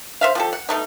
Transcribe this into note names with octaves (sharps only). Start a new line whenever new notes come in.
C5 E5 F5
F3 G4 A4
F#5
B2 A3 D#4